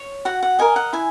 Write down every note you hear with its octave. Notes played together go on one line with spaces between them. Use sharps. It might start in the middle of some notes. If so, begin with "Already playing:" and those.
Already playing: C#5
F#4 F#5
F#5
A#4 D#5 G#5
F#5
E4 G#5